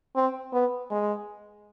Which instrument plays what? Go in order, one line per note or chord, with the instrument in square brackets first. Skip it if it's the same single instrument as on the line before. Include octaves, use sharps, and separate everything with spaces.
[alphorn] C4
B3
G#3